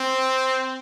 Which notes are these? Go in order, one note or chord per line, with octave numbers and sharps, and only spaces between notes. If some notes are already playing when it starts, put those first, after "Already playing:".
Already playing: C4